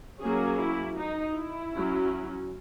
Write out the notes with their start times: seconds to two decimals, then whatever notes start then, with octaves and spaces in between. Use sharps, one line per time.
0.20 F#3 A#3 C#4 G#4
0.59 E4
0.97 D#4
1.36 E4
1.74 F#3 C#4